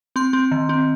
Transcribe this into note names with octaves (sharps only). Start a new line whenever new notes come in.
C4 C6
C4
D#3
C4